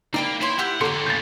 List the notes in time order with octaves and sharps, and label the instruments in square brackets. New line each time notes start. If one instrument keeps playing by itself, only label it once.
[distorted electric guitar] A#3 [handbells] D#4 [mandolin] D5 G5 B5
[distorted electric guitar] E4 [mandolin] C#5 G5 C6
[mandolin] E4 G4 [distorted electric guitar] F#5
[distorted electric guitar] D3 A#3 [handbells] A4 C6 C#7 [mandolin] C#5 G5
[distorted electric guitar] A2 C#3 [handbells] G6 A6